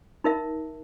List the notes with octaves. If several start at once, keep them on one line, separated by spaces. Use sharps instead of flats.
D#4 A#4 E5